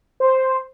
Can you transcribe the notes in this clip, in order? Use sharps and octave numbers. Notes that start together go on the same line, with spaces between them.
C5